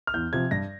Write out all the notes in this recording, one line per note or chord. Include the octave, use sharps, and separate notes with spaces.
F6
E2 G6
C3 F3 G#6
G2 A#6